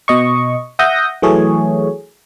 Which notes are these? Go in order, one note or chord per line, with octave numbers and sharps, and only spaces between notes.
B2 D#5 C#6
E5 F#5 D#6 G6 A#6
E3 F#3 A3 G#4 C#5